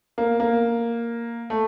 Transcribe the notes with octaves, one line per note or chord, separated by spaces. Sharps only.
A#3
A#3
A3